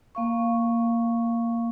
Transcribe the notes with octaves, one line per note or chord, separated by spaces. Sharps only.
A#3 F5 C#6